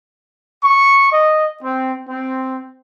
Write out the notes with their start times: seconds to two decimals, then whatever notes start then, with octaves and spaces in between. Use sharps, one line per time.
0.64 C#6
1.13 D#5
1.63 C4
2.09 C4